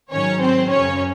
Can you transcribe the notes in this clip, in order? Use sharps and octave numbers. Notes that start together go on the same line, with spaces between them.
G#2 D#3 F#3 C#4 C#5
C4 C5
F#2 C#3 F#3 C#4 C#5